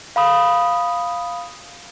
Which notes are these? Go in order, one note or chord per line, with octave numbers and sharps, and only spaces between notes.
F5 B5 D#6